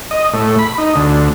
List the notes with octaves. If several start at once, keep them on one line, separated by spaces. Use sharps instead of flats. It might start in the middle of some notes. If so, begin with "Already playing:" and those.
D#5
A2
B5
D#4
D2